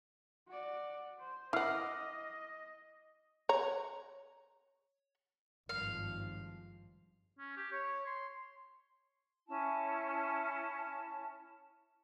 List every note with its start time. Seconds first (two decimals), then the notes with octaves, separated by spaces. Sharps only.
0.48 F#4 D5
1.19 C5
1.53 E4 D#5 F#5 D6 F6 C7
3.49 C#5 A#5
5.69 G#1 G2 F3 F5
7.39 C#4
7.57 G4
7.72 C#5
8.06 C6
9.48 C#4 E4 A5